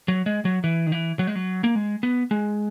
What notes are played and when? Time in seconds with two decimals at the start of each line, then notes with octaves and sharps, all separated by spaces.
0.08 F#3
0.26 G#3
0.45 F#3
0.64 E3
0.87 D#3
0.92 E3
1.19 F#3
1.27 G#3
1.35 F#3
1.64 A#3
1.75 G#3
2.03 B3
2.31 G#3